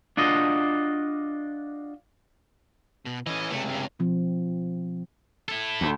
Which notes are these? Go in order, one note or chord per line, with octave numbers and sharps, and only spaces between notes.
D4 F4 F#4 D#5
B2
E3 C#4 D#5
C#2 C3 A3
G2
B2 F3 C4
E4 A4
D2